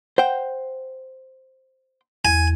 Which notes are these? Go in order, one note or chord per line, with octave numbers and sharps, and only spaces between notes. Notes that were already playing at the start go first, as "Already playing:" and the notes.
C5 F#5 G5
E2 G#5